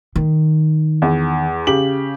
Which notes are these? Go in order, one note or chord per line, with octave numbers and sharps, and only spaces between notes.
D#3
E2
C#3 G4 F#7